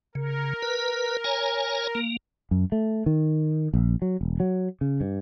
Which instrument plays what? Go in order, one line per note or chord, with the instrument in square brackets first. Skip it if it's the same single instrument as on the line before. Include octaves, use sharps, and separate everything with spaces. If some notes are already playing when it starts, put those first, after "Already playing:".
[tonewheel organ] C#3 [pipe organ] A#4
[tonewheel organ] B4
C#5 G#5 A#5
A#3
[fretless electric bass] F#2
A3
D#3
A#1
F#3
E1
F#3
C#3
G2